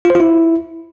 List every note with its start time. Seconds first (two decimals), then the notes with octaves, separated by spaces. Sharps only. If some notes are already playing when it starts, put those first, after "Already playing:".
0.05 F4
0.10 C5
0.15 F4
0.20 E4